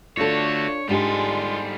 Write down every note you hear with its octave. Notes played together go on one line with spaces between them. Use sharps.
D3 A3 D4 F4 F#4 A4 C#5
G#2 G3 G#3 D4 F4 G4 A4